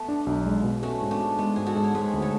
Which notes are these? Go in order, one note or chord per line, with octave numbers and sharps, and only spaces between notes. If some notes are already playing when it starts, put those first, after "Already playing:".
Already playing: A3 B3
D4
B1
G#3
B2
A3 C#4 F#4
G#2
B3 D4
F#4
G#3 B3
G#2 G#4
F#4 A4
G#2
C#5
G#3 G#4 B4
D2
A4 C#5